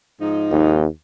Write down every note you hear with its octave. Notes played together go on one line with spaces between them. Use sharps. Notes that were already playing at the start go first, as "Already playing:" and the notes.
G#2 F3 D#4
D#2